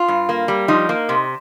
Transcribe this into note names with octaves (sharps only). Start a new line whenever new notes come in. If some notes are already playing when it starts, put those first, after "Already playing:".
Already playing: F4
G2
A#3
G3
F3 D#4
A#3
C3